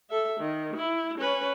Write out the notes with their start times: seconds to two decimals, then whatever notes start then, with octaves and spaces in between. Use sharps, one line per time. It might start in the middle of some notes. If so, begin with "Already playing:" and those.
0.10 A4 E5
0.40 D#3
0.76 E4
1.18 C#4 B4